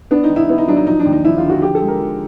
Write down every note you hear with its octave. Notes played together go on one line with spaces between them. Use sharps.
B3 D4
D#4
D#3
E4
B3 E4
D#4
F#3 D4
D#4
F3 D#4
D4
D#2
D#4
F3 E4
F4
D3
F#4
F3 G4
A4
G#3
A#4
F3